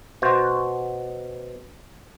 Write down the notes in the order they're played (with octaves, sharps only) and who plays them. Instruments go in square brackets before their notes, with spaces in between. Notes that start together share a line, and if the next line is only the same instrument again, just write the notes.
[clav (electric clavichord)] B2 F#4 C5